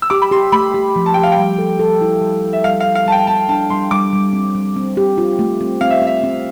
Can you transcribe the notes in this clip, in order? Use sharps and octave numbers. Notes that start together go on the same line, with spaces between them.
E6
G4 D6
B5
G4 C6
A3 B5
G4
F3
A5
G4 G5
F5
G5
G3
A4
A4
E4
G3
E4
E5
G3 F5
F5
G3
F5
G3 A5
G5
G3 A5
D4 A5
G3 C6
G3 D6
G3
C4
G3
C4
G4
F4
A3
C4
C4 F5
E5
C4 E5
C4